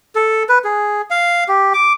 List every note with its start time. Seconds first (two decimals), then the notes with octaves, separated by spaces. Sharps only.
0.15 A4
0.49 B4
0.64 G#4
1.10 F5
1.48 G4
1.74 D6